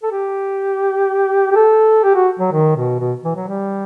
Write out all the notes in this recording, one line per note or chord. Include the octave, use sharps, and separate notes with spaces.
A4
G4
G4
A4
G4
F#4
F#3
D#3
B2
B2
E3
F#3
G3